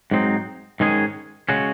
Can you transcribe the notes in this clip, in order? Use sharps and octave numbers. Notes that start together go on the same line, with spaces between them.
G#2 F#3 C4 D#4
G#2 D#3 G#3 C#4 G#4
C#3 G#3 C#4 F#4